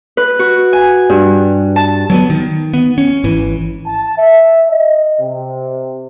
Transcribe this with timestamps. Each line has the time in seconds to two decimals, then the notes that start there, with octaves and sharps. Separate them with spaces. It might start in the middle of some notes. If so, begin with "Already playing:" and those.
0.17 B4
0.39 F#4
0.73 G#5
1.10 G2
1.76 A5
2.10 F#3 A#3 B3
2.30 D#3
2.74 B3
2.98 C#4
3.24 G#1 E3
3.86 A5
4.18 E5
4.70 D#5
5.19 C3